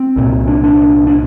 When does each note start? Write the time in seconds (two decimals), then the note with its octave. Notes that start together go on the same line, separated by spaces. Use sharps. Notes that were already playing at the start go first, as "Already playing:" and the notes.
Already playing: C4
0.16 C2 A#2
0.48 D4
0.64 D4
1.07 D4